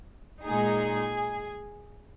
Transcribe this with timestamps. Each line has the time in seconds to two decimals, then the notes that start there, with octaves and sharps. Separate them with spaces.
0.44 A#2 G#3 D#4 G#4